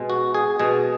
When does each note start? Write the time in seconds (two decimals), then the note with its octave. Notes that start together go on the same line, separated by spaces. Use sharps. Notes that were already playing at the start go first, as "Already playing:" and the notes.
Already playing: B2 G#3
0.10 F#4
0.34 G#4
0.59 B2 G#3 G#4